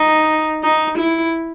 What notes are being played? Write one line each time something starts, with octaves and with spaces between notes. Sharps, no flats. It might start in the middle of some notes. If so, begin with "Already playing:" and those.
Already playing: D#4
D#4
E4